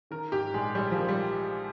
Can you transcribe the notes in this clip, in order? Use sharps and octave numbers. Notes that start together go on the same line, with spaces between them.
D#3 A#4
G#2 G4
A#1 G#3
A#1 G3
F3
D#3
G3